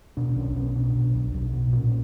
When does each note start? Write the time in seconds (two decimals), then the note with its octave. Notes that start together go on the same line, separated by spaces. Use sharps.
0.17 B2 D4
0.36 B1 C#4
0.56 B1 C#4
0.75 B2 D4
0.95 B2
1.15 B1
1.34 B1
1.53 B2
1.73 A#2 C#4